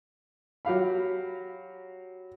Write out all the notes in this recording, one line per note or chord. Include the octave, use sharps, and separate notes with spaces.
F#3 G4 F5 B5